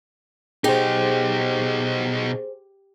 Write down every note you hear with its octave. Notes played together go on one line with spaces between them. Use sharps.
B2 D#4 G4 G#4 C5